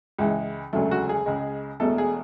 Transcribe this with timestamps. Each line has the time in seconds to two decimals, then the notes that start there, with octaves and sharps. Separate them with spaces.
0.18 C#2 C#3 E3 G#3
0.73 E1 D2 C#3 F#3 A3
0.91 F#4
1.09 G#4
1.26 C#2 C#3 G#3
1.80 E1 E2 B2 A3 A4
1.98 G#4